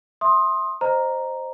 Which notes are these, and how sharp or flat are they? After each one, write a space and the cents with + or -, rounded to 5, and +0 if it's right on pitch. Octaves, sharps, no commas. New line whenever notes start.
E5 -5 C6 +20 D#6 +0
C5 +0 D#5 -20 A#5 +0